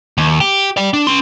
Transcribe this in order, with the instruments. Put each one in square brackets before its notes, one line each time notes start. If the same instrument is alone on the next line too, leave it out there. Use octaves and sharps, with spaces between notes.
[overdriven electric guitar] D#2
G4
D5 G5
D4
C#4 C6